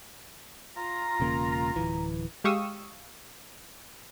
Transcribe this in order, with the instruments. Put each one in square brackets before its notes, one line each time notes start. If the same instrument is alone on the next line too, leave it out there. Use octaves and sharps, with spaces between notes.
[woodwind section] F4 A#5
[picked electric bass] E1 C#3 A#3
D1 G1 E3
[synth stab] G#3 G4 F5 C#6 D#6 E6